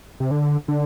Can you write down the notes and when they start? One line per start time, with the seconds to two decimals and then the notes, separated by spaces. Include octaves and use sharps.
0.20 C3
0.31 D3
0.68 D3